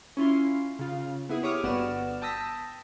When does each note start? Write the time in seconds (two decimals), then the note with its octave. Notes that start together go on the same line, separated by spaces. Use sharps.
0.17 C#4 E4 F4 C6
0.79 C#3 F4
1.29 B3 E4 G#4
1.43 G4 C#5 D6 D#6 F6
1.63 G1 B3 F#4 D5 F6 E7
2.22 G5 A5 D#6 E6 A#6 B6